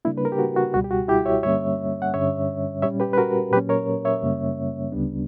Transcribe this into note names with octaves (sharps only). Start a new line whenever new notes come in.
C#3 G3 A#3 D4 E4
B4
A#4
G4
F#4
F#4
C#2 B2 G3 F#4
G4
F#4
E4 G4
C#5 E5
G2 D3 G3 A#3 C#4 C#5 E5
F#5
G2 D3 G3 C#4 C#5 E5
A#2 G3 C#4 C#5 E5
G4 B4
B4
F#4 A#4
A#2 F#3 A#3 C#4 G4 B4
A#4 C#5
C#5 E5
F#2 C#3 G3 A#3 C#4
D2 C#3 G3 B3 D4